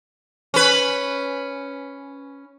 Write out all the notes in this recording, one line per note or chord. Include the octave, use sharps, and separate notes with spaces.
C#4 B4